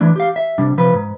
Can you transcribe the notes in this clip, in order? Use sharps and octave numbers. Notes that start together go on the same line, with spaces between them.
D3 E3 A3 D4
G4 F5
E5
C3 G3 D4
C3 F3 B4
G#2